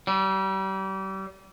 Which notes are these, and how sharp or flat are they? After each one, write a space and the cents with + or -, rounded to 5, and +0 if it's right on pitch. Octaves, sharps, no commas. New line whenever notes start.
G3 -35